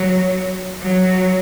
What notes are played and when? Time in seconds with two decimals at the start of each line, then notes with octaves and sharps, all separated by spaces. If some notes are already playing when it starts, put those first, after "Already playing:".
Already playing: F#3
0.82 F#3